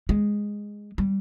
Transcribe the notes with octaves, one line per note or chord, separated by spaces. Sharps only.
G#3
G3